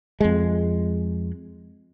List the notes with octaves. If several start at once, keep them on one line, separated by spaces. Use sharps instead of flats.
F2 G#3